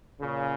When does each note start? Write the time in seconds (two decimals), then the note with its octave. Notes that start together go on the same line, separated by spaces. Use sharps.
0.20 A#2 C#3